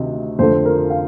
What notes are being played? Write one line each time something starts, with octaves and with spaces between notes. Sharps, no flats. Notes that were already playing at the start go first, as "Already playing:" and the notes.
Already playing: D2 C3 D#3 D#5
F2 D3 A3 C5
A#4
F5